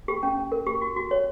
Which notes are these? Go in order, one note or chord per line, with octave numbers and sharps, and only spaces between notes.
G4
C#4
C#4
A#4
G4
F#4
F#4
C#5